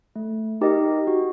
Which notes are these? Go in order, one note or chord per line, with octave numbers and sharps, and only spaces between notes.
A3
D#4 G4 A#4 D#5
F#4